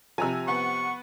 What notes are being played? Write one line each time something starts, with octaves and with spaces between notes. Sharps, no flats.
C3 F3 G#5 A#5 E6
B3 F#5 C#6